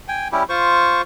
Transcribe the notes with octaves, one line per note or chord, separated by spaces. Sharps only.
G5 G#5
G3 C#4 E4 G4
F4 C5 C#6